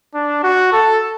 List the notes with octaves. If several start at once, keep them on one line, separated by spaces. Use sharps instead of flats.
D4
F#4
A4